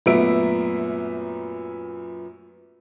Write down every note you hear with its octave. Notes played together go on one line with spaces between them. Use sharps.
F#2 A#2 A3 B3 E5 D7